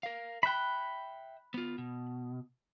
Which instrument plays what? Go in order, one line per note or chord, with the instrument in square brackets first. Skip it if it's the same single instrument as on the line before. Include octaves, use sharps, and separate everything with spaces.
[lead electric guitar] A#4 F5
[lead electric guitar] E5 G5 [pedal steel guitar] B5 F#6
[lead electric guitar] B3 F4
B2